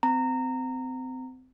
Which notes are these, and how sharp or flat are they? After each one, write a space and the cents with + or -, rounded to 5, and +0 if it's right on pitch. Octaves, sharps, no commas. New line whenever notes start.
C4 -30 A#5 -20